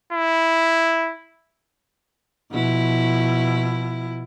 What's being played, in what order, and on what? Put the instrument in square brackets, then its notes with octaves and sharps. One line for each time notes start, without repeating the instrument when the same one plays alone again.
[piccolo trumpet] E4
[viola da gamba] B2 F3 E4